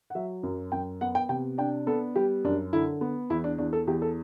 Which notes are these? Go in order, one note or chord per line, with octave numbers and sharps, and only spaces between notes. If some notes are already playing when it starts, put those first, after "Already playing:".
F#5
F#3 E5
F#2
F#2 G5
B3 F#5
G5
C3 G5
D4 G5
B3 A4
G3 G4
F#2 D4
D3 E4
B3
E2 E4
D4
E2 D4
A4
E2 G4
A4